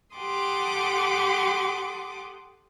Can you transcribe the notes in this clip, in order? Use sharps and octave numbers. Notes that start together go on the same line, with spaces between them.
G4 A4 F#5 C6 D6 D#6